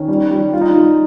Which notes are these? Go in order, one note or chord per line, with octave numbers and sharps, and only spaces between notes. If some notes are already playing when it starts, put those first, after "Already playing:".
Already playing: D#3 C#4
G3
G3
G3 F4
D#4
F4
G3